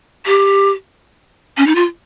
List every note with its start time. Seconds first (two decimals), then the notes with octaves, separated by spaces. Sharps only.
0.26 G4
1.57 C#4
1.66 D#4
1.75 F4